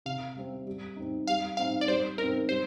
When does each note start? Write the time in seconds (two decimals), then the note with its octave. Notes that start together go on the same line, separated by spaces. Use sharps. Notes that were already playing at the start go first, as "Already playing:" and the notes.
0.06 C3 F5
0.36 G3 C4
0.67 G3
0.96 C4 D#4
1.27 G3 F5
1.57 C4 D#4 F5
1.81 D5
1.88 G3 C5
2.18 C4 D#4 A#4
2.49 G3 C5